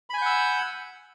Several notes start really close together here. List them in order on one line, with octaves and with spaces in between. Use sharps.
B5 G#5 G6 F#5 E6